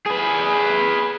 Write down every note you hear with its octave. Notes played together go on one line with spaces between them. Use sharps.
G#4 B4